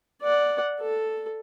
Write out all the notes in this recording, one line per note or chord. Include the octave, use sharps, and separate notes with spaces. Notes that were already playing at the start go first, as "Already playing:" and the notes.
D5 F#5
A4